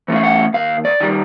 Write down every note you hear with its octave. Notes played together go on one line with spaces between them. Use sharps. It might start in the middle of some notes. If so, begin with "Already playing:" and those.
E3 A3 C#4 E4
F5
F#5
D#2 F5
D5
D#3 G3